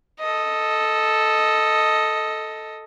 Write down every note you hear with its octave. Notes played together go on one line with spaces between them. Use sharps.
A4 D#5